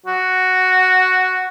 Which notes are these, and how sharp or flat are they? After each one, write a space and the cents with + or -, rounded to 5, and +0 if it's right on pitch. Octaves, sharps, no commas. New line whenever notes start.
F#4 +0